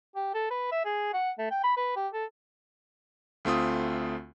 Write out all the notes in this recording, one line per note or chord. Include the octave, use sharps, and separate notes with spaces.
G4
A4
B4
E5
G#4
F#5
A3
G5
B5
B4
G4
A4
D2 A3 C4 F4 D#6